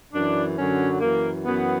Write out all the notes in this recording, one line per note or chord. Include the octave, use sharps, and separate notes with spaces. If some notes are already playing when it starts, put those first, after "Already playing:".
F#2 E3 D4
F#2 D3 F#3 C#4
F#2 E3 A#3
F#2 E3 B3